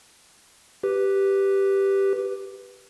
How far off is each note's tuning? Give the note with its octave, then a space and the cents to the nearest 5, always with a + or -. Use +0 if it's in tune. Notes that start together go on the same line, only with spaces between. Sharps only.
G4 +0 B4 +0